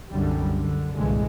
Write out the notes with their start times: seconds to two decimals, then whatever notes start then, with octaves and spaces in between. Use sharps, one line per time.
0.11 C2 F#2 D3 G3
0.55 D3
0.95 C2 G2 A#2 D3 E3 G#3